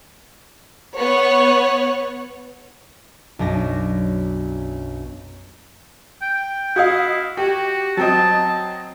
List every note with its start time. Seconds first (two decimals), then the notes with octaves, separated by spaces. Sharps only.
0.97 B3 C#5 F#5
3.39 B1 F#2 D4 A#6
6.22 G5
6.76 E4 F#4 D#5 F5
7.37 F#4 G4
7.97 F#3 C4 D#5 A5